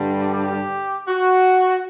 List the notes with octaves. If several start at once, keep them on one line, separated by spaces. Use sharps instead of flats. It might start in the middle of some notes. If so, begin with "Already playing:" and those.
Already playing: G2 D3 G3
G4
F#4